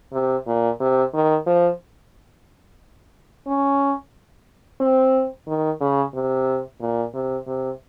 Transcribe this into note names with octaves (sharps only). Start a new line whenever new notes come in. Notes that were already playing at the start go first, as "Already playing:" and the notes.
C3
A#2
C3
D#3
F3
C#4
C4
D#3
C#3
C3
A#2
C3
C3